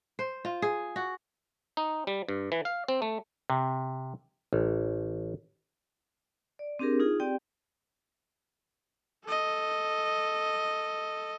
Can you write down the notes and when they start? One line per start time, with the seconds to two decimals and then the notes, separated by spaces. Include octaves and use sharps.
0.19 C5
0.45 F4
0.62 G#4
0.96 F#4
1.77 D#4
2.07 G3
2.29 G2
2.52 E3
2.65 F5
2.88 C4
3.02 A3
3.50 C3
4.53 A1
6.59 D5
6.79 C4 D4 G4 G#4 A#4
7.00 D#4 F4 G#4
7.20 C4 G4 D5 G5
9.25 A4 D#5